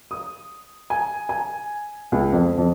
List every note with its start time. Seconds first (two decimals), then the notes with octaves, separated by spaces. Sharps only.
0.11 D#6
0.90 G#5
1.29 G#5
2.12 C#2
2.32 F2
2.58 F2